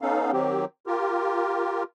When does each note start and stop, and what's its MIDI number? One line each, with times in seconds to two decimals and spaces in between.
0.02 0.31 59
0.02 0.31 61
0.02 0.31 63
0.02 0.31 69
0.02 0.31 77
0.32 0.65 51
0.32 0.65 54
0.32 0.65 60
0.32 0.65 67
0.87 1.83 65
0.87 1.83 67
0.87 1.83 70